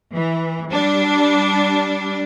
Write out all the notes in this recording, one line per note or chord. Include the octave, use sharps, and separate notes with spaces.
E3
G3 D4